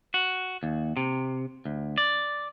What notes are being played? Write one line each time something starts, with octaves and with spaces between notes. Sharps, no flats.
F#4
D#2
C3
D2
D5